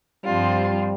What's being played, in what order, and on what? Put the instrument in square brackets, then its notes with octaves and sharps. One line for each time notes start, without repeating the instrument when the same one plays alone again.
[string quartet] G2 F3 C4 F4 [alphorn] G3